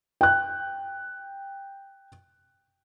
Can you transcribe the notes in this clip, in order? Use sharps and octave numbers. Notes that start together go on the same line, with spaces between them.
G5 F#6